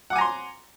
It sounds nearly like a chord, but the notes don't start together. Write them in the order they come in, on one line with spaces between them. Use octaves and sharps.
F#5 D6 G#5 A#5 C6